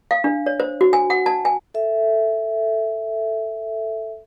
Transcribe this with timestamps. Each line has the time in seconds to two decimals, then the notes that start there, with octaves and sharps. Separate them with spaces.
0.11 F5
0.24 D4
0.46 C#5
0.60 C5
0.81 F#4
0.93 G#5
1.10 F#5
1.26 A5
1.45 G#5
1.74 A4 E5